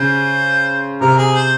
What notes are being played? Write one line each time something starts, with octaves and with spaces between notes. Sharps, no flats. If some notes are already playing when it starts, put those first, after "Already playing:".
Already playing: C#3 C5
C3 A#4
G#4
C5